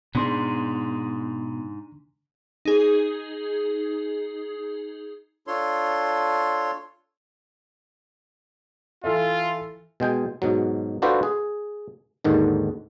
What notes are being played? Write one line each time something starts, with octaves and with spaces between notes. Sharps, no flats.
G#2 B2 D4 C6
D#4 G#4
D4 F4 A4 C#5 C6
E3 F4 A4 E5
B2 G#3 G5 G#5
G#2 B2 F#3
D4 F4 F#4 A4 B4 C5
G#4
D#2 G#2 D3 D#3